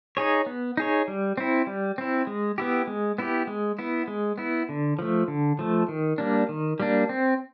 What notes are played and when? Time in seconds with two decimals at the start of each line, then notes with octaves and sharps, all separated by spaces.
0.17 D#4 G#4 C#5
0.46 B3
0.77 D#4 G#4 C#5
1.08 G3
1.37 C4 E4
1.67 G3
1.98 C4 E4
2.27 G#3
2.58 B3 E4 G4
2.87 G#3
3.18 B3 E4 G4
3.47 G#3
3.79 B3 E4
4.08 G#3
4.38 B3 E4
4.69 D3
4.99 F3 A3
5.28 D3
5.59 F3 A3
5.88 D#3
6.18 G3 A#3 D4
6.49 D#3
6.80 G3 A#3 D4
7.09 C4